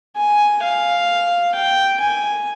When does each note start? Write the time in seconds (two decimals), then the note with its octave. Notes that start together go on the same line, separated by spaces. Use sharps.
0.17 G#5
0.63 F5
1.55 G5
2.00 G#5